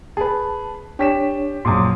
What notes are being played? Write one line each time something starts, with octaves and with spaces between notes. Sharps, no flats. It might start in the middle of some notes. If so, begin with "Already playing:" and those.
G#4 B4 A5
D4 G4 C#5 B6 E7
A#1 F#2 C6 D6 D#6